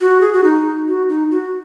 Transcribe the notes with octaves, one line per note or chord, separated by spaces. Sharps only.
F#4
G#4
F#4
D#4
F#4
D#4
F#4